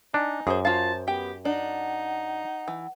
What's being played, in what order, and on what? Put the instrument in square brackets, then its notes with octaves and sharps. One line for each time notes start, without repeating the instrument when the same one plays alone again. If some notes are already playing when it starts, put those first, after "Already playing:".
[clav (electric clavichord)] D4 [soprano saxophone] D#4 [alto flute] G#5
[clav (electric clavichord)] F#2 [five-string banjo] G#4 C5
[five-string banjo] F4 F5 [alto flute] C5 [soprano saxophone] A5
[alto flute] B3 [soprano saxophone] G4 [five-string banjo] G5
[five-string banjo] D4 [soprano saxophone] D#4 [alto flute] F#5
[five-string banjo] E3